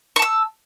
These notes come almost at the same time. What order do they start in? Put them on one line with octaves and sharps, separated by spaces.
C#6 A5 E6